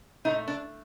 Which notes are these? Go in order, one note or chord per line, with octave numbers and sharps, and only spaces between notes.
A#2 A3 D#4
D4